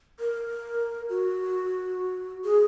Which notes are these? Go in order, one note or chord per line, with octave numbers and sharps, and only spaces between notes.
A#4
F#4
G#4